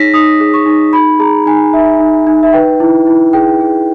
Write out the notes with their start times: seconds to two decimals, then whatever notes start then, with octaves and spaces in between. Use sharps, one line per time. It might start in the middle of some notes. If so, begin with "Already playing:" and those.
Already playing: D#4 G#4 C#5 A#6 B6
0.14 D#4 D#6
0.40 G#4
0.54 C#6
0.66 D#4
0.93 D#4 B5
1.20 G#4 A#5
1.46 D#4 G#5
1.73 D#4 E5
1.99 D#4
2.27 D#4
2.43 E5
2.53 B4 G5
2.80 E4
3.07 E4
3.33 G#4 G5
3.60 G#4